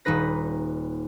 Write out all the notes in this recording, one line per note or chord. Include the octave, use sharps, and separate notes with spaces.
D#1 G3 D#4 B4 A#6